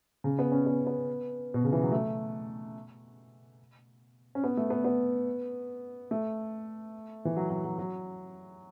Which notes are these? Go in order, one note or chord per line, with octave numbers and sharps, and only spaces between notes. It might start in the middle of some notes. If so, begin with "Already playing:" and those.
C#3
B3
C#4
B3
B3
B2
C#3
E3
F#3
A3
C#4
B3
A3
B3
B3
A3
E3
F#3
F#3
F#3
F#3